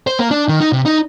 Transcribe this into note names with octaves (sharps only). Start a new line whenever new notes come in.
C5
A#3
D4
D#3
D#4
C3
D#4